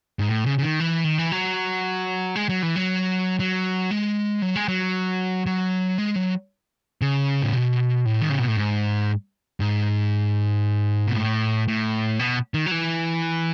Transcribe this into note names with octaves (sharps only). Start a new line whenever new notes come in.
G#2
A2
C#3
C#3
D#3
E3
D#3
E3
F#3
G#3
F#3
E3
F#3
F#3
G#3
F#3
G#3
F#3
F#3
G#3
F#3
C#3
A2
B2
A2
D#3
C#3
B2
A2
G#2
G#2
B2
A2
A2
B2
D#3
F#3
E3